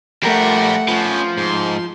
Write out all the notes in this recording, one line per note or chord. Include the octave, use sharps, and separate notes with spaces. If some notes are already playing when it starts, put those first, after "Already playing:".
F3 G3 A3 A#4 F#5
F3 C#4 B4
G#2 C6